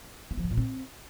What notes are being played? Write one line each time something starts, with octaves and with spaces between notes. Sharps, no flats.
B3
F3
B2
A#2
C4